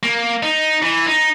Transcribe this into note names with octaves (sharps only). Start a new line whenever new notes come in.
A#3
D#4
E3
D#4